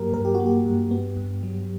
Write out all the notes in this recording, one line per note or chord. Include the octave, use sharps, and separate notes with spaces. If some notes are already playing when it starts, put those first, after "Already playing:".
Already playing: G2 F#3 A#3 G4 A#4
G2 A#4
G4
F#4
A#3
G4
G2
B3
G2
F#3